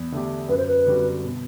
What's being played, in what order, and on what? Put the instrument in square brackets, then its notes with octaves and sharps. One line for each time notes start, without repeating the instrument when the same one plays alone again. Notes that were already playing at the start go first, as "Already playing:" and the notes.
Already playing: [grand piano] E2
D3 A3 D4 G4
[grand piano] F#2 [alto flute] B4
[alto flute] C5
B4
[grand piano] D3 G3 C4 F#4
B2